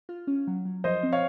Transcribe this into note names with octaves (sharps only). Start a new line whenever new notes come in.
F4
C#4
F#3
F#3
F3 C5 D#5
C4
C#5 F5